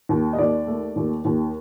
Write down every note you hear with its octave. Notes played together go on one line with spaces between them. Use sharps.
D#2
D#5
D#2 D5
A3
D#2
D#2